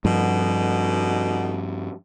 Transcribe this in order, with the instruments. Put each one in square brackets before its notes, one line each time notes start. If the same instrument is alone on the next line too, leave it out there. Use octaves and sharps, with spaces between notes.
[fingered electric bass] G2 F3 [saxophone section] B2 D3 D#4